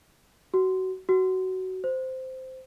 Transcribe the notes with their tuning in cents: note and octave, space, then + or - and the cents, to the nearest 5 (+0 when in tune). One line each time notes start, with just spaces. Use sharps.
F#4 +25
F#4 +20
C5 -10